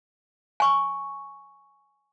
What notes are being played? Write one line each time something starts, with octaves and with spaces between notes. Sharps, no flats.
G#5 C#6